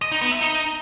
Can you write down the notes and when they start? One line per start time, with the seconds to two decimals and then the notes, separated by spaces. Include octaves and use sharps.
0.02 D#5
0.12 D#4
0.21 B3
0.31 E5
0.41 D#4